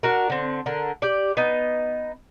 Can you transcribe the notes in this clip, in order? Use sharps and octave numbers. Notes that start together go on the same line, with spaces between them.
D4 F#4 A#4
D3 C4
D3 A#4
G4 D5
B3 D#4